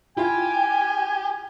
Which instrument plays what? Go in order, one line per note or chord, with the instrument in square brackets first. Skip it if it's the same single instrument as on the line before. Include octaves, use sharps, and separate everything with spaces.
[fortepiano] E4 F4 [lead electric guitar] G4 [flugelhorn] G#5